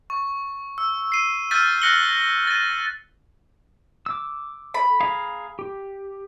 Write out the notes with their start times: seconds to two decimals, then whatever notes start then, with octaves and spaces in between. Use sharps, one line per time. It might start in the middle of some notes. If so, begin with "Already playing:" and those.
0.10 C#6
0.78 E6
1.12 C7 D#7
1.51 E6 F6 G6 A6 B6 D#7
1.82 F6 F#6 A#6 C#7 F#7 G7
2.47 A6 D#7
4.06 D6 E6
4.74 B5
5.01 G#4 F5 A#5
5.59 G4